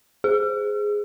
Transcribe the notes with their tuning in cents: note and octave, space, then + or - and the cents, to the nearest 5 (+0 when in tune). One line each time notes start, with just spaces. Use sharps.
G#4 +0